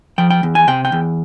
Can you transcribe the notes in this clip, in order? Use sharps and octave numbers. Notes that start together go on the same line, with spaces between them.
F3 G5
G5
E2
G#5
C3 G5
G5
E2